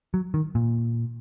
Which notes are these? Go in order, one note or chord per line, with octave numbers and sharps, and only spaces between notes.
F#3
D#3
A#2